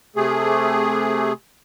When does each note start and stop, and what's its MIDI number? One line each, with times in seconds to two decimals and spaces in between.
0.16 1.32 48
0.16 1.32 57
0.16 1.32 68